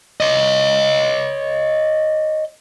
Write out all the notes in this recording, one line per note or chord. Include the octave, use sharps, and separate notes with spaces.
C#5 D#5